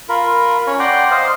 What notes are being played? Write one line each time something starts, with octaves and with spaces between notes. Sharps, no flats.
F4 A#4 B5
C#4 C#5
D5 F#5 G5 A#5 C6
C5 D#5 F5